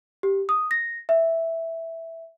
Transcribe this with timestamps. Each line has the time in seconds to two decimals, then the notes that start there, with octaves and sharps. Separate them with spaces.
0.23 G4
0.49 D#6
0.71 A#6
1.09 E5